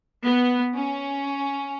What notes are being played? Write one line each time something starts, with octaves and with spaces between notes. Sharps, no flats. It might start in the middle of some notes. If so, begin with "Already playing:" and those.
B3
C#4